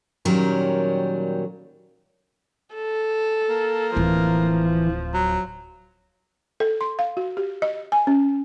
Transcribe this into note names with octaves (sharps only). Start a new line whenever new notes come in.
A#2 D#3 F#3 G3 C#4 A#4
A4
A#3
D1 E3 F3
F#3
A4
C6
F5
F#4
G4
D#5
G#5
C#4